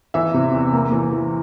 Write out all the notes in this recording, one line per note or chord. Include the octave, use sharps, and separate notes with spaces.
E3 E5
C3
E2
A#3
E3
E3